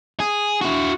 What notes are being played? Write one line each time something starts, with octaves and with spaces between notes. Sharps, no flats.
G#4
E4 F#4